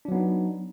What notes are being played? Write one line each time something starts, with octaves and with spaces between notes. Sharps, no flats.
F#3 B3 D4 D#4